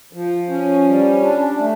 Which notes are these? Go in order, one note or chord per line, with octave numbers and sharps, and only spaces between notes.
F3
C#4
G3
D4
A3